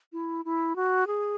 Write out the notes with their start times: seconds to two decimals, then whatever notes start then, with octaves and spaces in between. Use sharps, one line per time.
0.13 E4
0.45 E4
0.76 F#4
1.07 G#4